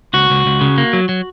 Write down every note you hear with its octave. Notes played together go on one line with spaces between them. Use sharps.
C#2 F#4
C#2
C#2
C#3
A#3
F#3
F#3